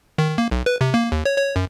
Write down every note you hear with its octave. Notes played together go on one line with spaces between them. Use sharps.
D#3
A#3
B1
B4
C3
A#3
D#2
C#5
C#5
F#2